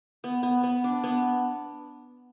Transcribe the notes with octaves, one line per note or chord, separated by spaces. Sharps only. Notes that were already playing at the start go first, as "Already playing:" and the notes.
B3
B3
B3
D4
B3